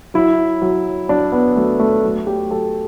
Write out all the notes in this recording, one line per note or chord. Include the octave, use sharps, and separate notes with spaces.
F#3 E4
F#3
F#3 D4
B3
F#3 A3
A3
F#3
G4
F#3 A4